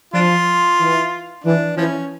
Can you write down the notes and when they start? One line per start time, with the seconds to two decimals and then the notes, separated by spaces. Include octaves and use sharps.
0.14 F3 D4 F4
0.79 E3
1.44 E3 D4
1.77 E3 F3 C#4